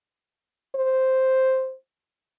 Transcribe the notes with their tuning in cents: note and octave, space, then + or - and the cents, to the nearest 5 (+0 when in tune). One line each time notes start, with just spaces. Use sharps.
C5 +0